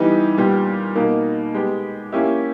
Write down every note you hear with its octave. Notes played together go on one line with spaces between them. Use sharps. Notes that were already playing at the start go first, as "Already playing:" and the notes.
Already playing: E3 G3 B3 D#4 G4
A#2 G3 B3 G4
B2 A#3 D#4 A#4
G#3 B3 G4
A#3 C#4 E4 G4